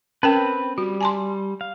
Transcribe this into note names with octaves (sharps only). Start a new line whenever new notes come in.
C4 C#4 A#4 B4 G5
G3 F#4
G#5 A5 C6
F5